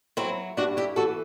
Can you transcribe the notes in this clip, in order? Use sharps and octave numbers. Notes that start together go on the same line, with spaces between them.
F#3 C4 E4
G2 D4 F#4
E4 G4
E3 F#4 A4